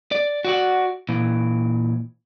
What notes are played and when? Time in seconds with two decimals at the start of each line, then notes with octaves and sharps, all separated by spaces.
0.12 D5
0.45 F#4 D5 F#5
1.09 A#2 E3